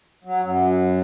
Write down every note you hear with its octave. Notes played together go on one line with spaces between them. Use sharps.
F#3
F#2